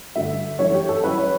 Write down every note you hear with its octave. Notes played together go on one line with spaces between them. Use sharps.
G2 D3 A3 E5
F#2 E3 A3 D4 C#5
G4
A4
A2 F#3 C#4 E4 B4
C#5